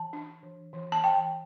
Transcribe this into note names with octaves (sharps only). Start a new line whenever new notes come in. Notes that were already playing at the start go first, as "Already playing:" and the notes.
Already playing: E3 A5
D4
E3
E3
A5
E3 G5